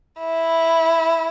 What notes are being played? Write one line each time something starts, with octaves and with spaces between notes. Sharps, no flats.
E4